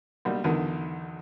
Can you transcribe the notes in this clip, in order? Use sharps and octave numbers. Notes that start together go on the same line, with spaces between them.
B1 G3 A#3
B1 E2 D3 D#3